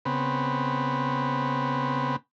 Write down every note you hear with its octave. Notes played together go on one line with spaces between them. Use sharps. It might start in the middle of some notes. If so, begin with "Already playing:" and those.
C#3 B3 C4 B5